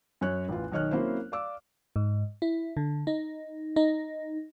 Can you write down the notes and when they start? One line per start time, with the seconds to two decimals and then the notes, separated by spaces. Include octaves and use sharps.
0.21 F#2 C#4 C#5 F#6
0.48 A1 E2 E3 F4
0.72 B1 D#3 C#5 D#5 F6 F#6
0.91 F#3 A#3 C4 C#4 E4 C5
1.32 D5 F5 D6 E6
1.96 G#2
2.42 E4
2.77 D3
3.07 D#4
3.76 D#4